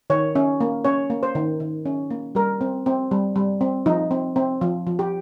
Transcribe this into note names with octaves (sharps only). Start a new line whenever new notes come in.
D#3 C#5
C#4
A#3
C#4 C#5
A#3
C5
D#3
D#3
C#4
A#3
G3 A#4
C4
C4
G3
G3
C4
F3 D#4
C4
C4
F3
F3
G4